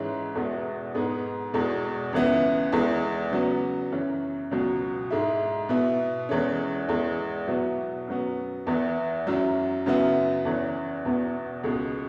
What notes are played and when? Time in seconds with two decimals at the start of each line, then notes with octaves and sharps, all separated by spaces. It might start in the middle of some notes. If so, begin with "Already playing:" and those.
Already playing: G#2 E3 G#3 C#4 E4
0.35 E2 B2 G#3 B3 E4
0.95 G#2 G#3 B3
1.54 E2 B2 G#3
2.13 C#2 C#3 E3 B3 E4
2.72 E2 E3 G#3
3.31 C#3 F#3 B3
3.92 F#2 E3 C#4
4.51 C#2 B2 F#3
5.10 G#2 G#3 E4
5.69 B2 B3 E4
6.29 E2 E3 G#3 C#4
6.88 E2 E3 G#3
7.48 B2 F#3 B3 E4
8.08 F#2 F#3 B3
8.67 E2 E3 B3 E4
9.27 F#2 F#3 E4
9.86 F#2 C#3 F#3 B3 E4
10.45 E2 E3 C#4
11.05 E2 B2 B3 E4
11.63 C#2 B2 G#3